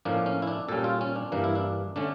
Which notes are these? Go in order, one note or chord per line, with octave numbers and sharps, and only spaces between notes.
A2 F3 A#3 C#4 D4
C#4
E4
D4
A#2 G3 C#4 A4
F4
C#4
D4
G2 E3 A#3 D4
E4
D4
D3 A3 C#4 D4